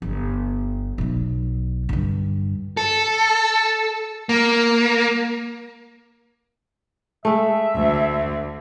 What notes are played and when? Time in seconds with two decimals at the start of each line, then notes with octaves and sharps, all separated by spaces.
0.02 G1
0.98 B1 B2
1.89 G2 D3
2.77 A4
4.29 A#3
7.25 G#3 A3 E5
7.75 D2